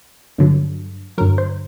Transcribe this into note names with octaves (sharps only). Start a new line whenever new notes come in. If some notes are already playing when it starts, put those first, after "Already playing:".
G2 D3 F#3
G2 D3 F#3 A#4
C5